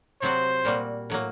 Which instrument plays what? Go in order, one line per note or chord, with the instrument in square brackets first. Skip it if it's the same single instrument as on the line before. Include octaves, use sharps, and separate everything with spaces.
[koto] C3 F#3 C4 F#4 [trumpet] C5
[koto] A#2 G3 A#3 F#4
A2 F#3 A#3